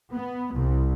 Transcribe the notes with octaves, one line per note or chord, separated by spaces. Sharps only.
B3
C2